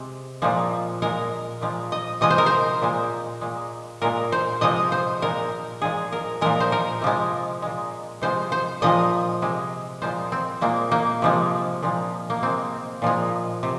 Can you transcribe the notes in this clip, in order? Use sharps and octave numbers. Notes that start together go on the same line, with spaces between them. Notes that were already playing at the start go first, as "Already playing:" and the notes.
Already playing: C3 G#3
A#2 F3 G#3
A#2 G#3 A#4
A#2 F3 G#3
D#5
C3 F3 G#3 D#5
C5
A#4
C5
A#2 G#3
A#2 G#3
A#2 G#3 A#4
C5
C3 F3 G#3 D#5
C5
A#2 G#3 A#4
A#2 F3 G#3 G#4
A#4
A#2 F3 G#3 A#4
C5
A#4
C3 F3 G#3
A#2 G#3
C3 F3 G#3 C5
C5
A#2 F3 G#3 D#5
C3 G#3
A#2 F3 G#3 C5
C4
A#2 G#3 A#3
A#3
C3 F3 G#3
A#2 F3 G#3
A#3
C3 G#3 C4
A#2 F3 G#3
C3